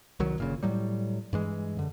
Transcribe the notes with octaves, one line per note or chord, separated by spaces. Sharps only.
C2 D#3 F#3
G1 A#2 C#3
A2 F#3 G3
G2 E3 G#3
F#2 D3